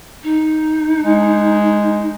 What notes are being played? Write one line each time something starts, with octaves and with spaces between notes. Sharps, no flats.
D#4
G#3